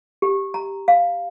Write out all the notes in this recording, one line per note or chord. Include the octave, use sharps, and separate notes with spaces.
G4
A#5
F5